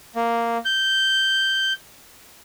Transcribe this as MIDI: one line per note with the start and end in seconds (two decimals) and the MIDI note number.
0.16 0.58 58
0.65 1.73 91